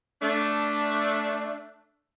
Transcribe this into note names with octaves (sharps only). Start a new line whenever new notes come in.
A3 D4